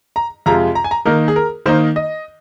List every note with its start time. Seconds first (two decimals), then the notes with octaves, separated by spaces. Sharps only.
0.16 A#5
0.46 F2 C3 G#3 F4 A#5
0.75 A#5
0.84 G#5
0.91 A#5
1.05 D#3 A#3 D#4 A#4
1.28 G#4
1.36 A#4
1.66 D#3 A#3 D#4 C5
1.96 D#5